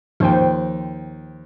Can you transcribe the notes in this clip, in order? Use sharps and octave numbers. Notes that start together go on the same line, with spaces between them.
D#2 F3 C5 G5